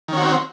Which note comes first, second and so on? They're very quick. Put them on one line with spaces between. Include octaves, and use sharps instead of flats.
D#3 C#4 F#4 C4